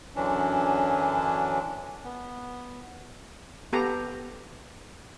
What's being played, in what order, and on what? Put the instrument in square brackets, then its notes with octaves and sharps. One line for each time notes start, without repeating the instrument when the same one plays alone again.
[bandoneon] F#2 D3 E3 F#3 C#4 D4
B3
[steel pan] B3 G4 A4 A#5